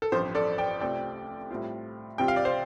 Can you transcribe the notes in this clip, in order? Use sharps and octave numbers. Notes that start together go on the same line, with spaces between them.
A4
A1 G2 F3 C4 C5
A4 D5
D5 G5
C2 C3 A3 C4 F4 D5 G5
A2 G3 C4 F4
C2 C3 G3 C4 F4 G5
F5
D5
C5 F5